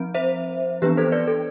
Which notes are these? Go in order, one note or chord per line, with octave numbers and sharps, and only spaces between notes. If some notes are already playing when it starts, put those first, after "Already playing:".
Already playing: F3 C4
C5 E5
E3 B3 D4 G4 B4
A4 C5
B4 D5
A4